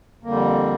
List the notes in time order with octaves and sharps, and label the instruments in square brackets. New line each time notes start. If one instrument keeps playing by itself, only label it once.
[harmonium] F2 D3 G3 A#3